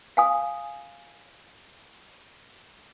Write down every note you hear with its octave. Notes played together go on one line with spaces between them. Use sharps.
F5 G#5 D#6